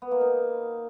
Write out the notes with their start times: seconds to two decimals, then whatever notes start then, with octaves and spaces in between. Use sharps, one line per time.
0.02 B3
0.11 A#3
0.21 D#4